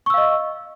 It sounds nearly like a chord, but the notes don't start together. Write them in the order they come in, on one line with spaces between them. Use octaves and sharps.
C#6 E6 F5 D#5